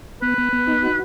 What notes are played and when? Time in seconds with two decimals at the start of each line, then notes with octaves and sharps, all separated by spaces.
0.22 B3 B4
0.38 B3
0.53 B3
0.67 D#4
0.83 F#4